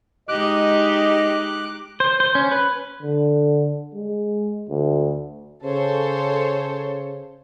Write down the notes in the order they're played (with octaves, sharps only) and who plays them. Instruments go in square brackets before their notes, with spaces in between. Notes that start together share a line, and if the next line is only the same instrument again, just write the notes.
[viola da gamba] G#3 D#4 G4 [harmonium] D#5 [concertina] D6 F#6
[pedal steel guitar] C5
C5
C#4
B4
[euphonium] D3
G#3
D2
[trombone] C#3 [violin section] A4 C5 C#5